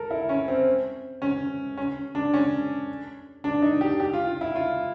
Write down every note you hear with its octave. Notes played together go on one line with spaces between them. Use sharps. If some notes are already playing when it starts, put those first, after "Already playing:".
Already playing: A4 A#4
E4
C#4
C4
C#4
C#4
D4
C#4
D4
D#4
G4
G4
F4
F4
E4
F4